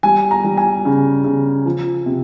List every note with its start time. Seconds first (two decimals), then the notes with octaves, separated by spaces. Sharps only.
0.03 G3 G#5
0.31 A#5
0.44 G3
0.58 G#5
0.85 C#3
1.24 C#3
1.65 F3
2.06 C3